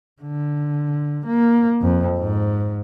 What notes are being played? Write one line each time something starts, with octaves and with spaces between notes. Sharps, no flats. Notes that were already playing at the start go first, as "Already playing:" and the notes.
D3
A#3
F2
G#2